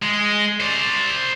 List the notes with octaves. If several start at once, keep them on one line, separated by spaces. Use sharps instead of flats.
G#3
C5 D5